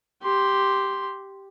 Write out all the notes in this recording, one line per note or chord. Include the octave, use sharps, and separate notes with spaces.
G4 C6